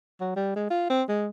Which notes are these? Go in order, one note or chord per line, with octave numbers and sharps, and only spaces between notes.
F#3
G3
G#3
F4
C4
G#3